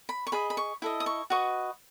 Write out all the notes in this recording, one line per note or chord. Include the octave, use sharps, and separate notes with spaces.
B5
C#6
G#4 D#5 B5
B5
C#6
E4 A4 D#5
D#6
C#6
F#4 B4 D#5 C#6